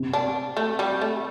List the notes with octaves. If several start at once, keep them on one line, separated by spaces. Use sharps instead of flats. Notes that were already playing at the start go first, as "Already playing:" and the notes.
Already playing: C3
D4
A3
G3
A3